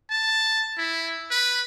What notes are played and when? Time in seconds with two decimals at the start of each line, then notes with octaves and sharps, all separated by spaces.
0.11 A5
0.78 E4
1.31 B4